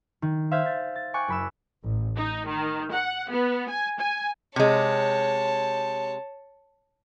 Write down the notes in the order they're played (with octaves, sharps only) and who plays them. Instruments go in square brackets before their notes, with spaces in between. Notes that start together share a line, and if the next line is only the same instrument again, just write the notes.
[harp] D#3
C5 E5 F5 G6 G#6 B6
G6 A6
A6
G5 G#5 C#6 D6 F#6
F#1 B5 E6
[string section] A1
D#4
D#3
F#5
B3
G#5
G#5
[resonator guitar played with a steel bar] C3 G#3 [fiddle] C#5 A5